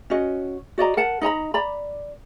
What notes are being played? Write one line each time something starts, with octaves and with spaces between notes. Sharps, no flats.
C#4 F#4 D#5
F#4 D5 D#5 A#5
A#4 F#5 A5
D#4 D#5 A#5 B5
D5 A#5 B5